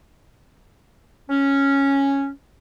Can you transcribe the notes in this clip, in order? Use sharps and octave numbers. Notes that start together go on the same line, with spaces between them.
C#4